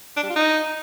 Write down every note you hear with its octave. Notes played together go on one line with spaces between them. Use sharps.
D4
G3
F4
D#4